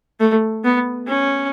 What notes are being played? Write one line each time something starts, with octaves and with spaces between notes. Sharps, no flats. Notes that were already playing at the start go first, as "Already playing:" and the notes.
A3
B3
C#4